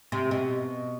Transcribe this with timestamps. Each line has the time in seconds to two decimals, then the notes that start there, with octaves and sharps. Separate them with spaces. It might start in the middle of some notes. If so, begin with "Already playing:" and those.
0.12 C3
0.31 B2